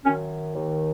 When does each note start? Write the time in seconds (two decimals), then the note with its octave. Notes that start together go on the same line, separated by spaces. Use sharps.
0.05 F#2 D#3 C#4
0.56 D#2 D#3